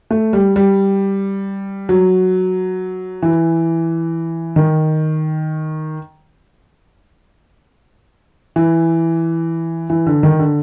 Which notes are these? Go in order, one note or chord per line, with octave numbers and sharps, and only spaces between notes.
A3
G3
G3
F#3
E3
D#3
E3
E3
D3
D#3
D3